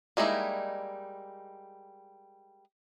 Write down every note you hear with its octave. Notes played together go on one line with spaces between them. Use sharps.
G3 G#3 A#3 D#4 E4